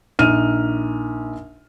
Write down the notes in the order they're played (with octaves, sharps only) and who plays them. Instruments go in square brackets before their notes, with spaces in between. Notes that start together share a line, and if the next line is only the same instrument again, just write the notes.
[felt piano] A#1 D#4 F6 D#7